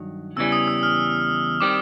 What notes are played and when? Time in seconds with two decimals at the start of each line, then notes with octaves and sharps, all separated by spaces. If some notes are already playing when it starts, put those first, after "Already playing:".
Already playing: G2 D#3 F#3
0.36 E2 C#3 E3 G3 E6
0.52 D#6
0.68 E6
0.83 F6
1.60 D#3 G3 C4 D6